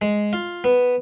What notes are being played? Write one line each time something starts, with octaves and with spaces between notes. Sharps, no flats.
G#3
F4
B3